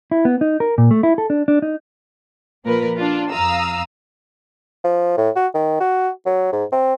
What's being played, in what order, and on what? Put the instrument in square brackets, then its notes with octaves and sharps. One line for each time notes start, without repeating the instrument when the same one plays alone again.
[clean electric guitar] E4
B3
D#4
A#4
A#2
A3
E4
A4
D4
D4
D#4
[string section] A#2 F3 A#4 B4
D4 F4
F2 F5 A#5 D#6 E6
[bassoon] F3
A2
F#4
D#3
F#4
F#3
G#2
C4